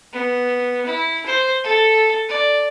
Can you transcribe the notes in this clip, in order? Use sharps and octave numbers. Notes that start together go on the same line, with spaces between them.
B3
E4
C5
A4
D5